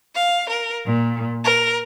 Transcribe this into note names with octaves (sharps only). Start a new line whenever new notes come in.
F5
A#4
A#2
A#4